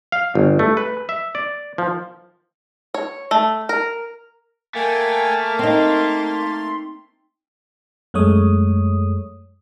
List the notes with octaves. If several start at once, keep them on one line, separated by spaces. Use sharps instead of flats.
F5
G1
A3
B4
E5
D5
F3
C#5
A3
A#4
A3 A#3 G5 G#5
C4 D#4 C6
F#2 G#3 A3 C#5 D#6